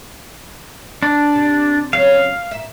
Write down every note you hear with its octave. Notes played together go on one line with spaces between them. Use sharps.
D4
C3
C#3 F#3 C#4 F5
A#2 E5